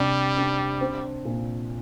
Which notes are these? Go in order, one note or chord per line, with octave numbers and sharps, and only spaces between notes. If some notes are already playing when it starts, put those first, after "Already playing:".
Already playing: C3 G3 D4
D4
C4
A#2